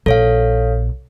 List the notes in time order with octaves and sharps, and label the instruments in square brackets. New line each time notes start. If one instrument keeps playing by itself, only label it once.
[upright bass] A#1 [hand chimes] A4 C#5 F5